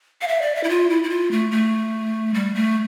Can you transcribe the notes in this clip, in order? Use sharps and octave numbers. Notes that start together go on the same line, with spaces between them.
F5
E5
D5
E5
E4
F4
E4
E4
F4
A3
A3
G3
A3